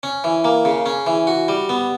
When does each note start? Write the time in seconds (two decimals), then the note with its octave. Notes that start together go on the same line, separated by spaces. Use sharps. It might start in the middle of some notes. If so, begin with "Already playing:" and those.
0.03 C#4
0.24 E3
0.45 A#3
0.65 C#3
0.86 C#4
1.07 E3
1.27 F#4
1.48 G3
1.69 B3